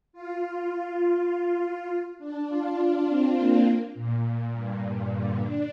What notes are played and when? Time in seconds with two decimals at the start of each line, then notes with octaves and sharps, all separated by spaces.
0.13 F4
1.89 F4
2.19 D4
2.48 F4
2.77 D4
3.07 C4
3.36 A#3
3.65 A#3
3.95 A#2
4.53 G2
4.83 A#2
5.12 D3
5.42 D4